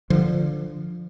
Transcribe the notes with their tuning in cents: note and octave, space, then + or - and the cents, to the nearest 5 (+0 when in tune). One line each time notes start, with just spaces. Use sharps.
D3 +15 F3 +0